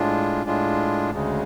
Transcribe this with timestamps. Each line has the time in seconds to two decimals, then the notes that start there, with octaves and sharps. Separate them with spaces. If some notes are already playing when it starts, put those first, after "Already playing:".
Already playing: A2 G#3 D4 F4
0.46 A2 G#3 D4 F4
1.11 D2 C#3 G#3